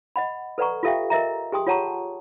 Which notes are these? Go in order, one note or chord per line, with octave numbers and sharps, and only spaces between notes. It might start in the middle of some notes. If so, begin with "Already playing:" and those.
D#5 F#5 B5
A4 B4 D5 F#5 A#5 C#6
F4 G4 A4 E5 F5 G5
A#4 D#5 E5 A#5
G4 G#4 G5 C6 D#6
F4 C#5 F#5 A5 A#5 C#6